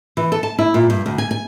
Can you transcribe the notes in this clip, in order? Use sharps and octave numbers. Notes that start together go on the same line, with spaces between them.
E3
A4
A5
E4
A#2
G2
D2
G#5
G#5